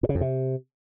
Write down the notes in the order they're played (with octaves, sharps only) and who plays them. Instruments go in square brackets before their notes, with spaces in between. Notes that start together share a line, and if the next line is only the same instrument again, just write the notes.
[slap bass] A2
C#3
F2
C3